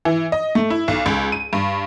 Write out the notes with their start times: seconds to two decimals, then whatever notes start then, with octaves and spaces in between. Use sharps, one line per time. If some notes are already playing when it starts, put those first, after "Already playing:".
0.05 E3
0.32 D#5
0.55 A3
0.70 E4
0.88 B1
1.06 C#2
1.32 D#7
1.53 G2